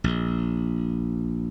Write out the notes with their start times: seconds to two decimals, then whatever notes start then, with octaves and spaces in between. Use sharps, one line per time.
0.04 A#1